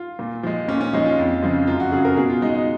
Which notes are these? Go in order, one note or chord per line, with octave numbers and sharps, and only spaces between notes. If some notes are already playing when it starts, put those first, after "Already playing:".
Already playing: F4
A#2
F3 G#3
A#2 C#4
C#4
F3 G#3 D#4
F4
F2
C#3 F3 G#3
F#2 F4
F#4
C#3 F#3 G#4
A#4
B2 G#4
F4
G#3 D#4
D#4